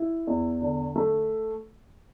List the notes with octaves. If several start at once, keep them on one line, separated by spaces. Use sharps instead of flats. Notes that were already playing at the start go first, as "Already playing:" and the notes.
Already playing: E4
E2
D3
A3